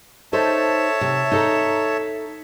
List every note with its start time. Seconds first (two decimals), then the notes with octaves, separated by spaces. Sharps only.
0.33 D#4 A4 C5 C#5 E5 A5
1.01 C3
1.31 D#4 A4 A#5